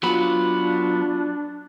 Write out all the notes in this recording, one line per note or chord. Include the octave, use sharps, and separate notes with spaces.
F#3 B3 D4 F4 B4